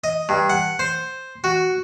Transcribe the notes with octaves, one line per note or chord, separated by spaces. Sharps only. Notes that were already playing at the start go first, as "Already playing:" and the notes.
D#5
G2
F#5
C5
F#4